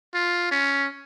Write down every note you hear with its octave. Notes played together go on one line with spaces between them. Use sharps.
F4
C#4